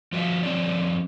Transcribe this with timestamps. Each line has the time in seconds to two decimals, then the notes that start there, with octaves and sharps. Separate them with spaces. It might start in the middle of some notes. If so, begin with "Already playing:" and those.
0.12 F3 F#4 D5 E5 F5
0.43 F3 C4 C#4 D5